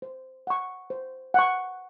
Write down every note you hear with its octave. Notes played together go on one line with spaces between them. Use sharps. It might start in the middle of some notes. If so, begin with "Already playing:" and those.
C5
F#5 C#6
C5
F#5 C#6